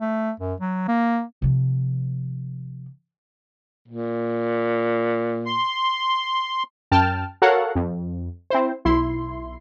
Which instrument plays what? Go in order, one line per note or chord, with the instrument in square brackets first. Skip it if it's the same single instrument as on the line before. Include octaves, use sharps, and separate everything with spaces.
[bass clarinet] A3
F#2
F#3
A#3
[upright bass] C3 F3
[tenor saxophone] A#2
[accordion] C6
[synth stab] F#2 G5 A5 F6
F#4 A4 A#4 C#5 F5 F#5
F2
C4 E4 C5
B1 E4 C6